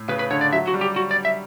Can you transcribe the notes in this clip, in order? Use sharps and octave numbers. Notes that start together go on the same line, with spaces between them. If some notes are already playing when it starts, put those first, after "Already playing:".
Already playing: A2
C#3 B4
B4
D3 C#5
D5
F#3 E5
F#4
G3
G4
F#4
D5
E5